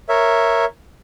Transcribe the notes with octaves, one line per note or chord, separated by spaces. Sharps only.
A#4 C#5 E5